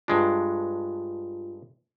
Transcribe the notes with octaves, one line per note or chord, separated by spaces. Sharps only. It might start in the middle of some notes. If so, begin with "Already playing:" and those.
G2 G#3 D4 F4